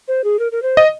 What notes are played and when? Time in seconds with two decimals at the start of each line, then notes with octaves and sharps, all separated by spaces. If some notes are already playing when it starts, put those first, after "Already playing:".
0.08 C5
0.24 G#4
0.39 A#4
0.52 A#4
0.63 C5
0.77 D#5